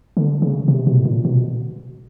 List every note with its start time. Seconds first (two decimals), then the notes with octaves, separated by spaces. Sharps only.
0.17 D3
0.42 C#3
0.68 C3
0.87 B2
0.99 A2
1.05 A#2
1.25 B2